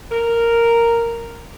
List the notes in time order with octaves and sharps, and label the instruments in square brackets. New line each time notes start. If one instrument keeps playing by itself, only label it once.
[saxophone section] A#4